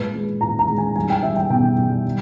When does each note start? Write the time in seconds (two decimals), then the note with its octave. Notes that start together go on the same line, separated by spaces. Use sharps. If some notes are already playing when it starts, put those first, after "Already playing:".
Already playing: A#2 G#3 B4
0.15 G#3
0.41 A#2 A#5
0.59 A#5
0.69 G#3
0.78 G#5
0.96 G3 G#5
1.10 G5
1.23 G3 E5
1.36 G5
1.50 B2 G5
1.77 G3
2.05 G3